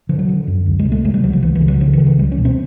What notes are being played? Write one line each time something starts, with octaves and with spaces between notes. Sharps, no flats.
D3 F3
F#3
D3
F#2
C#2
G#3
C3
A3
C3 G#3
G3
C#2 F#3
F3
C#2 E3
E3
C#3
F#3
C#3 F3
E3
C#2
E3
C#2 G3
C#4
B2
C4